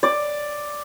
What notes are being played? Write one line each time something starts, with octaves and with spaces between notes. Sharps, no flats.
D5